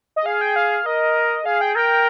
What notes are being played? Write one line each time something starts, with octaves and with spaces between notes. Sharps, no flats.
D#5
G#4 F5
G5
F5
A#4 D#5
G#4 F5
G5
A#4 G5